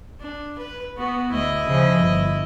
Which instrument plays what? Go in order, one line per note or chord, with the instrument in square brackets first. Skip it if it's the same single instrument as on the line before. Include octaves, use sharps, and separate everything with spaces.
[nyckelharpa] D4
B4
[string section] B3 [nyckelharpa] F#4
[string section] D2 [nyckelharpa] E4 D#5
[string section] C#3 F3
G1